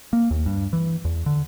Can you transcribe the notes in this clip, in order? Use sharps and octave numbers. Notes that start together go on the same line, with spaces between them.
A#3
D#2
G2
E3
E2
D3